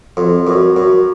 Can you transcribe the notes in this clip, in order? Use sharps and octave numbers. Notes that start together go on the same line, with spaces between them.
F2
F#2
F#2